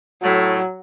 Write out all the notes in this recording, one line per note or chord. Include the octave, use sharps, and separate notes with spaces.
A2 F#3